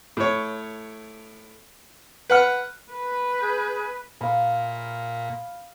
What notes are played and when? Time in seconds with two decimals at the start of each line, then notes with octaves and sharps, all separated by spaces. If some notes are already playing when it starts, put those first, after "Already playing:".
0.17 A2 C#5
2.30 B4 F#5 F6
2.92 B4
3.41 G#4 G6
4.21 A#2 F5 B5